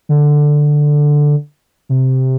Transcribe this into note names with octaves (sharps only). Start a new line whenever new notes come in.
D3
C3